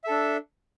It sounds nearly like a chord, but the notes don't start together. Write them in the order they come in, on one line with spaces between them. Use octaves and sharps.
E5 A4 D4